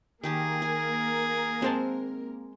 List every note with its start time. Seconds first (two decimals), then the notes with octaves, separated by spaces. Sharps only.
0.23 D#3 A#3 G4 G#4 A#4 A5
0.62 G#5
1.62 G#3 C4 C5 A5